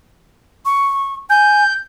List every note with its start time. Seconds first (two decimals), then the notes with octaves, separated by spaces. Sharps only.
0.66 C#6
1.30 G#5 G6